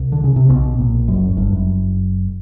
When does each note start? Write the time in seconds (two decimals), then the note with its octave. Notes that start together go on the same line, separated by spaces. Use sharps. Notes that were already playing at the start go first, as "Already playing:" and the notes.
Already playing: C2
0.12 D3
0.24 C#3
0.36 C3
0.49 B1 B2
0.78 A#1 A#2
1.08 F#1 F#2
1.29 F#2
1.37 G1 G2
1.52 F#1 F#2